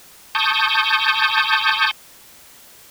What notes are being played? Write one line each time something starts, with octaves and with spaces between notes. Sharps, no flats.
A5 C#6 D#6 G6